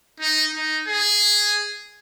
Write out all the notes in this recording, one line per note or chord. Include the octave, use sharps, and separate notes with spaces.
D#4
D#4
G#4